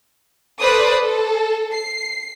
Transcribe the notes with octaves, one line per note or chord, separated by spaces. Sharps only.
A4 B4 C5 D5 D#6
A4
C7